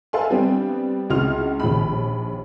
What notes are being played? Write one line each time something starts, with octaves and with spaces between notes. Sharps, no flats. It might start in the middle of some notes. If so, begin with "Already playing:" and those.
A4 B4 E5 F5 G#5 C6
G3 B3 C4 D4 G4
C#2 E4 F#4 C6 F6 F7
A#1 D#2 B5